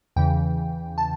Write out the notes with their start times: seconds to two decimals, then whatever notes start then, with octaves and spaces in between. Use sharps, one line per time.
0.16 E2 C#3 E3 G5
0.98 A5